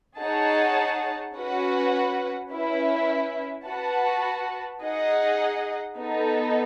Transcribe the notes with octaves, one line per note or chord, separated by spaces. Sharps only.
D#4 G#4 C#5 F#5 A5
C#4 F#4 B4 F#5
C#4 E4 B4 E5
F#4 B4 F#5 A5
D#4 G#4 D#5 F#5
B3 D#4 A4